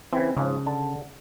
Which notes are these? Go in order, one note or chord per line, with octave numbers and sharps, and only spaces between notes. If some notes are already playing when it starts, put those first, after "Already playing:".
C#3 E3 C4
G#2 C#3 F3
D3 A5